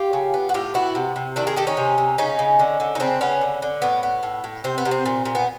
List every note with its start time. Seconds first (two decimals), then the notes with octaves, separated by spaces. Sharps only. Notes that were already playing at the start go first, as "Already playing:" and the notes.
Already playing: F4 G4
0.13 C#3
0.34 B3
0.49 F#4
0.54 A2 F4 G4
0.74 B3 E4 F#4
0.95 C3
1.16 C3
1.36 D#3 D4 E4
1.47 G#4 A#4
1.56 D#3 G4 A4
1.67 C#4 D#4
1.77 C3
1.98 C3
2.18 C#3 C#4 D#4
2.39 C#3
2.59 D3
2.80 D3
2.95 D#4
3.00 C#3 C4 D4
3.21 C#3 B3 C#4
3.41 D3
3.62 D3
3.82 A2 B3
4.03 B3
4.23 A2
4.44 A2
4.64 C3 C4
4.78 B3
4.85 C3
4.91 C4
5.06 A#2
5.25 A#2
5.35 B3